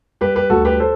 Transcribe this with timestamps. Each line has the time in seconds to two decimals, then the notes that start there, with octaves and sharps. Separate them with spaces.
0.21 G3 G4 B4
0.35 G4 B4
0.50 D2 F#4 A4
0.65 G4 B4
0.80 A4 C5